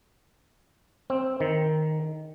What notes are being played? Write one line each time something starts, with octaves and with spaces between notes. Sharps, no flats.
C4
D#3